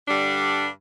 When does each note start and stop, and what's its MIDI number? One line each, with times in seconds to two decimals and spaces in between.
0.07 0.67 43
0.07 0.67 50
0.07 0.67 55
0.07 0.67 62
0.07 0.67 74